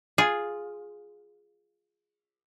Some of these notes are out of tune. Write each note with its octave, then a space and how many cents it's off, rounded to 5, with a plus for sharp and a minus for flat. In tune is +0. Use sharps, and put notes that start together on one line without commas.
F4 +5 G#4 +0